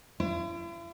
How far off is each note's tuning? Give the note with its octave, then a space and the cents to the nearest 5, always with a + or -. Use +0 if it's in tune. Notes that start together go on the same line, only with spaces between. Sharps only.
E4 +45